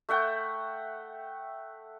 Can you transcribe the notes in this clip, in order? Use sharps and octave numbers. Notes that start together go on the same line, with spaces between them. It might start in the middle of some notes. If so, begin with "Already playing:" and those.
A3 E5 F#5 G5